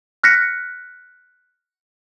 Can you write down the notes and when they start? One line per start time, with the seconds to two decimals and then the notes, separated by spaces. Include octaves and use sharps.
0.23 F6 F#6 A#6 B6 C#7